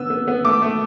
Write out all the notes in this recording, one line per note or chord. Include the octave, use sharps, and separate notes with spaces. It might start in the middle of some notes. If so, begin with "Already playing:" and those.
Already playing: D3 B3 E6
B3
B3
A3 D6
A3